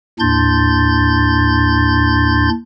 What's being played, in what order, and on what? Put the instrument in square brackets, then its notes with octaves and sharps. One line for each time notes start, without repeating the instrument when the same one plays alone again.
[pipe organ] D#2 A2 D4 C6 G6 A6